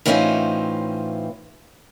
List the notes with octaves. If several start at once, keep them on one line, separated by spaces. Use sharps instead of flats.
A2 E3 C4 C#4 D#4 F4